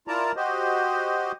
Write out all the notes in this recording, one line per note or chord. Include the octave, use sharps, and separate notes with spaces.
E4 F4 A#4 D5 A5 A#5
F#4 G4 C5 D#5